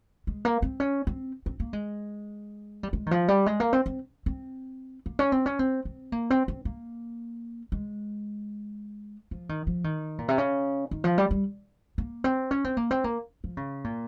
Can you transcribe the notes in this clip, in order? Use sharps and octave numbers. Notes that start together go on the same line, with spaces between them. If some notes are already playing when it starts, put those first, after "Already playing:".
G#3
A#3
C4
C#4
C4
C4
A#3
G#3
G3
G#3
D#3
F3
G3
G#3
A#3
C4
C4
C4
A#3
C#4
C4
C#4
C4
C4
A#3
C4
C4
A#3
G#3
F3
D#3
F3
D#3
A#2
C3
C#3
D#3
F3
G3
G3
A#3
C4
C#4
C4
A#3
C4
A#3
F3
C#3
A#2